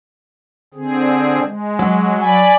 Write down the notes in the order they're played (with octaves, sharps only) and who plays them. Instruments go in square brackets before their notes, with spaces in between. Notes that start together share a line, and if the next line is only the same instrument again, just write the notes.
[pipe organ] D3 C4 G#4
G#3
[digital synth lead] F#3
[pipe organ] D5 B5 [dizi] G#5